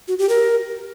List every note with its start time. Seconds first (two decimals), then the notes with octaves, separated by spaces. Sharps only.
0.08 F#4
0.18 G4
0.29 A#4